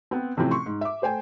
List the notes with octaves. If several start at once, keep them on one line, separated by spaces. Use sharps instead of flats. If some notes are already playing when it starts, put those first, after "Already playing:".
B3 C4
A2 C3 E3 F3 C4 C#4
C6 C#6
G#2
E5 D6
A3 C5 G5 G#5